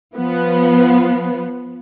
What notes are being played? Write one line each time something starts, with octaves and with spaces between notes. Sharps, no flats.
F3 B3